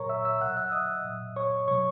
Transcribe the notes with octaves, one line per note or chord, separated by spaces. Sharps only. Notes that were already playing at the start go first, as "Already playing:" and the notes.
Already playing: A#2 F#3 A#4 C#5 A#5 C#6
E5 E6
E5 E6
B2 F#3 F#5 F#6
E5 E6
D#5 D#6
A#2 F#3
C#5 C#6
B2 F#3 C#5 C#6